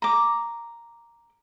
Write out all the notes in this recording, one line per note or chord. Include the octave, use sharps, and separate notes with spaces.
A#5 D6